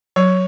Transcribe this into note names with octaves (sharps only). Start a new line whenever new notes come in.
F#3 C#5